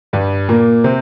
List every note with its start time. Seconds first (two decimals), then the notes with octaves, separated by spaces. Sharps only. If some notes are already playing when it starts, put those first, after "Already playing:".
0.13 G2 G3
0.49 A#2 A#3
0.84 C3 C4